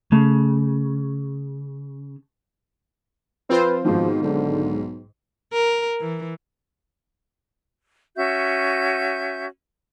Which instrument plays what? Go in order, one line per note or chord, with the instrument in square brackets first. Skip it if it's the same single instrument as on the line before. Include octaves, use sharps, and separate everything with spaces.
[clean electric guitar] C#3 [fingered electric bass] A3
[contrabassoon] F3 [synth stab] C4 F4 C5 [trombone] B4
[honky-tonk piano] G#2 D#3 [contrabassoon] B2 [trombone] F3
[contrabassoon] B1 [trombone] D3
[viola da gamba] A#4
E3
[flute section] C#4 F#4 E5 G6